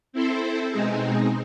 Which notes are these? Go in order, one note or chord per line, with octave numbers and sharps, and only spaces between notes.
C4 E4 A4 C5
B2 G#3 C4 D#4 G#4